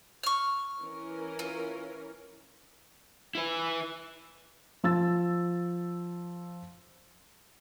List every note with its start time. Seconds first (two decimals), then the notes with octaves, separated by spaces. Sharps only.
0.23 C#6 F6
0.82 E3 C#4 A#4
1.39 F4
3.35 E4 B4
4.84 F3 E6 A6